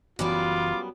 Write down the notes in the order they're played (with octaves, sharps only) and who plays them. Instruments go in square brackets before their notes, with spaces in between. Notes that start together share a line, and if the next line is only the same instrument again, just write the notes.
[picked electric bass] F#1 E3 [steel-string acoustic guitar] F#2 G3 B3 [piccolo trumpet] F4 [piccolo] D6